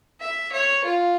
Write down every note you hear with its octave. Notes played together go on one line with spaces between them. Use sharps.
E5
C#5
F4